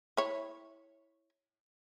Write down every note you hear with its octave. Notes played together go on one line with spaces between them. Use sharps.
E4 C#5